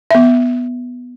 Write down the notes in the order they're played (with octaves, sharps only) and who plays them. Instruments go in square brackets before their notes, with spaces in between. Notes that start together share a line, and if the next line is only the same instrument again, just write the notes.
[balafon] B3 E5